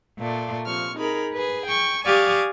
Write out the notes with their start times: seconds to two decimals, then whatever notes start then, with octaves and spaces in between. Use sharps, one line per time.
0.20 A#2 A3 D5
0.66 C3 F3 C#6 F6
0.97 D#4 G#4 A#4 B5
1.34 G#4 B4
1.68 G5 C#6
2.06 G4 D5 F5 G#5 C#6 D#6